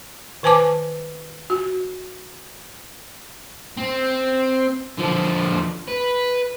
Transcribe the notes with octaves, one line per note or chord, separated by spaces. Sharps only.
D#3 B4 G#5 A5 D6
F#4
C4
D3 F3
B4